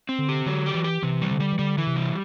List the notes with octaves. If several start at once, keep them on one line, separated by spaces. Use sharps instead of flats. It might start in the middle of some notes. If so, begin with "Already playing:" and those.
C4
D3
G4
D3 F#3
G4
E3
G4
C3 E3
G3
D3
G3
E3
D3 G3
E3
C3
G3